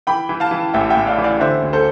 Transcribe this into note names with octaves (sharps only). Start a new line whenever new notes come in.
E3 G5 B5
E3
F5 A5
E3
A1 E5 G5
E5 G5
A2
D5 F5
E3
D5 F5
D3 C5 E5
D2
A4 C5